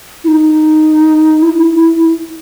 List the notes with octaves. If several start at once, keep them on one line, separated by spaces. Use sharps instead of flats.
E4
D#4
E4